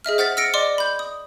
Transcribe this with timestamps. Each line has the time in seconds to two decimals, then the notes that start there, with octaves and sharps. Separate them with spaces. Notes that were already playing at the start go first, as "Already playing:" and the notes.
0.05 G#4 D#5 E5 F6
0.18 C5 F#5 F6 A6 B6
0.37 E6 F6 A#6 C#7 D7
0.54 D5 D#5 C6 D6
0.78 B5 G6
0.99 D#6